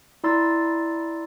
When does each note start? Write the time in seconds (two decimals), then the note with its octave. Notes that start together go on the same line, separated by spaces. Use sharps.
0.24 E4 D5 A#5 C6 E6 A6